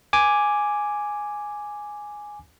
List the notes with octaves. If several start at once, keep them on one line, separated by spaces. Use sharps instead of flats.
G#5 D6